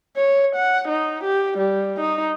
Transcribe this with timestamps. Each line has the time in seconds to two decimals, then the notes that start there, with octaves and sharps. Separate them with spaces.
0.17 C#5
0.56 F#5
0.89 D#4
1.24 G4
1.58 G3
2.00 D#4